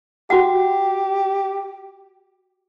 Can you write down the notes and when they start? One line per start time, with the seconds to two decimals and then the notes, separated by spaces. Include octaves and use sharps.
0.30 F#4 G4 F#5